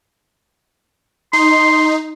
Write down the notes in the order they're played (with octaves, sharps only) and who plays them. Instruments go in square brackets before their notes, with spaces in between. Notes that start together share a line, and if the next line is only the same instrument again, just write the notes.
[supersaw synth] D#4 [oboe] C6